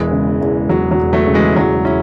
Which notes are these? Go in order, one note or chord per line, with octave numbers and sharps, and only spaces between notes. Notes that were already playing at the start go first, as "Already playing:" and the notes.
Already playing: E1 E3 G#3
C#3
E2
E1 F#3
F#3
E1
F#3 A3
C#3
E3 G#3
E2 F#3
C#4 E4